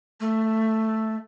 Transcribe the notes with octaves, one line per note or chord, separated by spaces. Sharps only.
A3